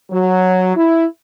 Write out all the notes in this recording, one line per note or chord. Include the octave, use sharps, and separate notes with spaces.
F#3
E4